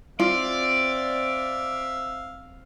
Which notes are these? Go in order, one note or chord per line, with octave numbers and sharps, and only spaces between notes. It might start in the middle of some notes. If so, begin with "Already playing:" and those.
C4 F4 D5 E5 F5